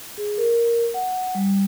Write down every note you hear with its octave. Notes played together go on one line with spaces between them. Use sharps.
G#4
A#4
F#5
G3